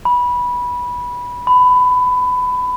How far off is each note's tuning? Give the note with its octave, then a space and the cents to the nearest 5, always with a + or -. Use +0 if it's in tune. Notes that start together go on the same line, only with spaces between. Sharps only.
B5 -15
B5 +20